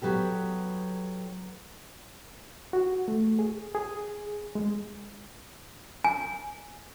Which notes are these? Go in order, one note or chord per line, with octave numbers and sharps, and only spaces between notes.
F#3 B3 G4 A4
F#4
A3
G#4
G#4
G#3
G#5